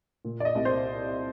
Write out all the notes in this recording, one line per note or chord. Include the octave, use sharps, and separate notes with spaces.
A#2
D5
D#5
C2
C5